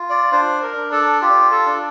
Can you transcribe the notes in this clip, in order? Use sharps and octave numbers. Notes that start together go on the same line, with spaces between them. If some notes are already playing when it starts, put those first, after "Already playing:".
Already playing: F4
D5
D4 C5
A#4
D4
A4
F4 G4
A4
D4